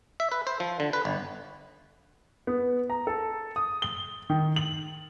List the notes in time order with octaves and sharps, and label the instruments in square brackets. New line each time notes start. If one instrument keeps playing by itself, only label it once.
[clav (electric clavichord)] E5
B4
C5
F3
D3
B4
G1
[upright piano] B3
A#5
A4
D#6
G7
D#3
F#7